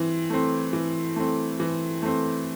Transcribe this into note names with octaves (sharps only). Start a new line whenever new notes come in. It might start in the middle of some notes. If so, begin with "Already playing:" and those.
Already playing: E3 C4
A3 C4
E3
A3 C4
E3
A3 C4